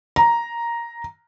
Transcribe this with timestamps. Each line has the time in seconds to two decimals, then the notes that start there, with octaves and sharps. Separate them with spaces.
0.16 A#5